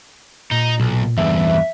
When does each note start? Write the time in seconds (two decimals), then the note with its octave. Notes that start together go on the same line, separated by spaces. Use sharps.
0.51 A#2 D#4
0.80 B1
1.01 A#2
1.18 E2 G2 E5